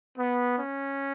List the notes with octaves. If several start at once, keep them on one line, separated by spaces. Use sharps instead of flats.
B3
C#4